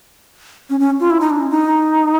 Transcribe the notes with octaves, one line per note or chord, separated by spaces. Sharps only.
C#4
C#4
F4
E4
D#4
D4
C#4
D#4